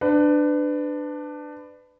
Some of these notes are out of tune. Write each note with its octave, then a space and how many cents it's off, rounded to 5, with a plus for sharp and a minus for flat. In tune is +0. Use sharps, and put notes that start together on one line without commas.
D4 +15 B4 +25